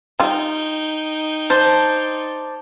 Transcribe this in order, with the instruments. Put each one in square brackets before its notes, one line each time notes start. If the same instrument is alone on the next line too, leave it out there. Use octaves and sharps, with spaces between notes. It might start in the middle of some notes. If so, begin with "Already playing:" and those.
[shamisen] G3 F4 [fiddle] D#4 G5
[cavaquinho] C5 D5 [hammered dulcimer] A5